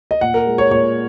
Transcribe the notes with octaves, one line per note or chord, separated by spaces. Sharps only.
D#5
A#2 F#5
A#4
G#3
C#5
A#2 C#5